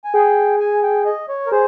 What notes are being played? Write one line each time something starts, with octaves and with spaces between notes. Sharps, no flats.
G#5
G#4 G5
G#5
G5
D#5
C#5
A#4
G#4 C5